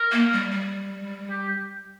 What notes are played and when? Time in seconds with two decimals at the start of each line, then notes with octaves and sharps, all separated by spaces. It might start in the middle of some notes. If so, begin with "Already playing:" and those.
Already playing: A#4
0.12 A#3
0.33 G3
0.51 G3
1.30 G4